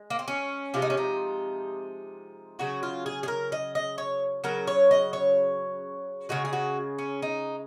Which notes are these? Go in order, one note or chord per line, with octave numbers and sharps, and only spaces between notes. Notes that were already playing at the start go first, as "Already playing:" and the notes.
Already playing: G#3
A#3
C4
C#4
C3 F3 G#3 F4
D#4
C#4
D#4
C#3 F#3 F#4
F4
G#4
G#4
A#4
D#5
D#5
C#5
C#3 F#3 A#4
C#5
D#5
C#5
C#3 G#3 F#4
G#4
F#4
C#4
D#4